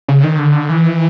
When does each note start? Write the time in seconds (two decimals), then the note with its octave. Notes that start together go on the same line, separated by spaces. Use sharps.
0.08 C#3
0.24 D#3
0.39 D3
0.69 E3